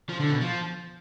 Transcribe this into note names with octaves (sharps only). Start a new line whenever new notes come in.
F3
D3
B2
F3